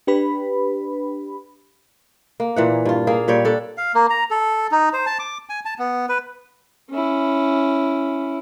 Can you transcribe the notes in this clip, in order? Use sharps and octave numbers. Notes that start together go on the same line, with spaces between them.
D4 G4 B4 B5
A#3
A#2 E3 F#5
G2 F4
A#3 G#4 F5
A#2 G3 C#5 G5
D4 A4
F5
A#3
A#5
A4
D#4
C5
A5
D6
G#5
A5
B3
B4
C#4 E4